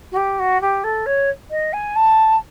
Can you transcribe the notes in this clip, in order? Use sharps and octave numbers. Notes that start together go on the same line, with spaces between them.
F#4
G4
F#4
G4
A4
C#5
D#5
G#5
A5